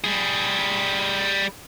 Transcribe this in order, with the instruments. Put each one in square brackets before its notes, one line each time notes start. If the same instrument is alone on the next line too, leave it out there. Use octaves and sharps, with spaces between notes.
[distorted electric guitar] G3 G#4